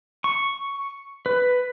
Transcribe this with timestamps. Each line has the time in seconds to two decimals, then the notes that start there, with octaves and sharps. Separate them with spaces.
0.24 C#6
1.26 B4